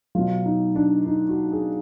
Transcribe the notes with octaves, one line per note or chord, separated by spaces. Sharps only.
B2 F#3 F4
D#4
D4
D#4
F#4
G#4